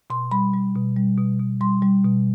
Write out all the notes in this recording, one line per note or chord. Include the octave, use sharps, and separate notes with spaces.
B2 C6
G3 B5
G3
B2
G3
B2
B2
G3 C6
G3
B2